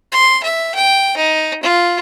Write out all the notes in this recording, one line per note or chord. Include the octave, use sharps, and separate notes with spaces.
C6
E5
G5
D#4
F4